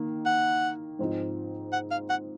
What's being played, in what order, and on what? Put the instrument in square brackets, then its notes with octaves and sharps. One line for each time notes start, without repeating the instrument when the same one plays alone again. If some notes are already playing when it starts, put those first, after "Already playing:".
Already playing: [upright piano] D#3 A#3
[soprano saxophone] F#5
[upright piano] G#2 F3 C4 D#4
[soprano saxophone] F#5
F5
F#5